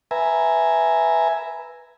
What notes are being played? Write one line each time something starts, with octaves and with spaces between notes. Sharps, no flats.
B4 E5 G#5 A#5